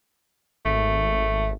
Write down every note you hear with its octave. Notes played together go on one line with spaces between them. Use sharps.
G#1 A3